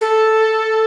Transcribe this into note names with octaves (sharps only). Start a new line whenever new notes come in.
A4